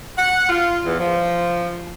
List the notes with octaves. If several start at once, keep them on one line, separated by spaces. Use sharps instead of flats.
F#5
F4
E2
F3